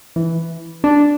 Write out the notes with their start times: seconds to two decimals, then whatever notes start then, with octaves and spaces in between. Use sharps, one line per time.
0.16 E3
0.84 D4